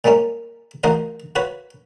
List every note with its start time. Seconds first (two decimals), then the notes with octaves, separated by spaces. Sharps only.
0.04 A#2 G3 G#3 A#3 C#4
0.84 A1 F#4 A#4 C5 D#5 F5
1.36 F4 F#4 B4 C#5